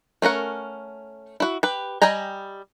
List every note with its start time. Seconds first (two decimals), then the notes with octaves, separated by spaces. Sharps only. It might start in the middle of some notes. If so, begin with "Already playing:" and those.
0.22 A3 C#4 A#4 F#5
1.40 E4 F#4
1.63 G4 B4
2.02 G3 D#5 G5 G#5 A#5